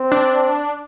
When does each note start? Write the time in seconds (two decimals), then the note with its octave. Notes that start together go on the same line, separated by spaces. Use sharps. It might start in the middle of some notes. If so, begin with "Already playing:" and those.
Already playing: C4
0.12 D4